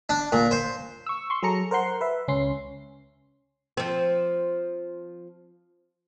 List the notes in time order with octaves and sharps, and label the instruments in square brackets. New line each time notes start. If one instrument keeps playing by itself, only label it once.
[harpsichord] D4
A#2
C5
[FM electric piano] C#6 E6
C6 C#6
F#3 G#4 A4 A#5 C#7
A#4 C5 F#5 C6
B4 E5
C#2 C#4 C6
[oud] F3 C4